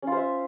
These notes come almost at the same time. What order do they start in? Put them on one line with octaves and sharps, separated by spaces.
C#4 F4 C5 E5